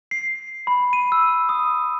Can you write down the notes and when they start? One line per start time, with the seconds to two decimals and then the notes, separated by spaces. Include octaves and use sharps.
0.11 C7
0.67 B5
0.93 D#7
1.12 E6
1.49 D#6